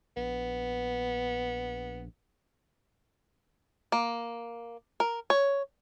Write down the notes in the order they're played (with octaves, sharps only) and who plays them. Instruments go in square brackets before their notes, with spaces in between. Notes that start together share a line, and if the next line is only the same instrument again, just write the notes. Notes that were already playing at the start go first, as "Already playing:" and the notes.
[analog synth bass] A#1 [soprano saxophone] B3
[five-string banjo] A#3
A#4
C#5